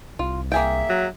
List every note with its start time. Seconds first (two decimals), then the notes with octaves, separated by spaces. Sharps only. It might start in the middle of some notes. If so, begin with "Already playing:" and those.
0.19 C2 F4
0.52 A#3 G#4 E5 G5
0.89 F#3